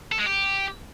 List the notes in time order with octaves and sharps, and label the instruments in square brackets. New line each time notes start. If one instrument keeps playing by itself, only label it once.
[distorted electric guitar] A4
G#3
G4